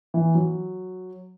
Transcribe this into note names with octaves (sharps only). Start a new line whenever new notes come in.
E3
F#3